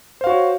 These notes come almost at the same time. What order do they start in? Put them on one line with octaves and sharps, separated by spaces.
C5 F5 F#4 C#5